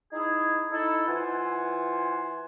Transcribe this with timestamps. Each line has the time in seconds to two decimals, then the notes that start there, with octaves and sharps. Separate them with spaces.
0.13 D#4 E4 G#4
0.71 D#4 E4 A4
1.08 E3 F4 C5 F#5 G#5